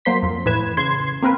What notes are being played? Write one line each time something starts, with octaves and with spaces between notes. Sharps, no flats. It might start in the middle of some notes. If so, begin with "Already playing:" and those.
F#3 A#3 C5 C6 B6
F2
A2 E3 B4 G#6 E7
C#3 C6 G#6 C7
A#3 C4 A#4 B4